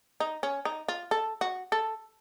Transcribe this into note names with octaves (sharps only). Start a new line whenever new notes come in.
D#4
C#4
D#4
F4
A4
F#4
A4